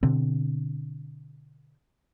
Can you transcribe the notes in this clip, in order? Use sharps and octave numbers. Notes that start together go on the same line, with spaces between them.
B2 D3 C4